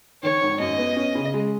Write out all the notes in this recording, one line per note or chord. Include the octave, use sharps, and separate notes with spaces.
D#3 C#5
G#1
F#2 D#5
B3
C#4
C#3
G#3